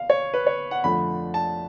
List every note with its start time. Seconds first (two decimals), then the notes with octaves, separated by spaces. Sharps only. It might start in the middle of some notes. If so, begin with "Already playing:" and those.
Already playing: F5
0.10 C#5
0.34 B4
0.47 C#5
0.71 F#5
0.84 F2 D3 F3 A3 B5
1.34 A5